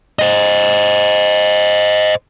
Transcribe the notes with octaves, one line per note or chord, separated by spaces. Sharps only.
C5 D#5